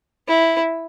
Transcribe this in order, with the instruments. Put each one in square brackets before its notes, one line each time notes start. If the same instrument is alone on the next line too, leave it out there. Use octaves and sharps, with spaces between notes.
[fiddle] E4